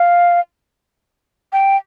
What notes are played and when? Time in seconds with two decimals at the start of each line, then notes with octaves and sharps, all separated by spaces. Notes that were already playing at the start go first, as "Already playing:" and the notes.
Already playing: F5
1.53 G5